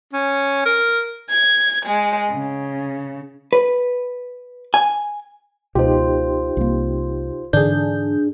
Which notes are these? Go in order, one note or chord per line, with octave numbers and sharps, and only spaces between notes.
C#4
A#4
G#6
G#3
C#3
B4
G#5
C#2 B2 D#4 F4 G4 C5
C2 A#3
G#2 D3 E3 D4 G#4 G6